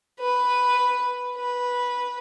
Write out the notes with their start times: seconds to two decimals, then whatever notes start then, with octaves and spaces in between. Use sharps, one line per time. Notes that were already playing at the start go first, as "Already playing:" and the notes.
0.20 B4
1.37 B4